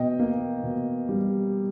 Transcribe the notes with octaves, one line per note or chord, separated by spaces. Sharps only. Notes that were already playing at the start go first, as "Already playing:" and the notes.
Already playing: B2 D#5 G5
A#3
B2
G3